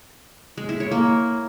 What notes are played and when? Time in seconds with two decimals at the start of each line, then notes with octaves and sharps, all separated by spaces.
0.58 G#3
0.69 E4
0.80 C#5
0.91 A#3